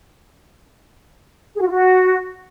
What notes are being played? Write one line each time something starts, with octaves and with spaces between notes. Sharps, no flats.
G#4
F#4
F4
F#4